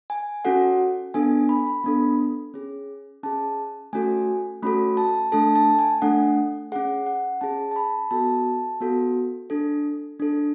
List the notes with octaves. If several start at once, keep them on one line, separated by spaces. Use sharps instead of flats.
G#5
C#4 F#4 A4 F#5
B3 D4 A4 G#5
B5
B5
B3 D4 A4
C#4 G#4
C#4 G#4 A5
A3 C#4 F#4 A4 G#5
A3 C#4 F#4 A4 B5
A5
A3 D4 A4 A5
A5
G#5
A3 D4 A4 F#5
C#4 G#4 F#5
F#5
C#4 G#4 A5
A5
B5
B3 F#4 A4 A5
B3 F#4 A4
D4 A4
D4 A4